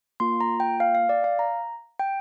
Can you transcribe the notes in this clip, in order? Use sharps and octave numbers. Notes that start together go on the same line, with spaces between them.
A#3 F4 C6
A#5
G5
F5
F5
D5
F5
A#5
G5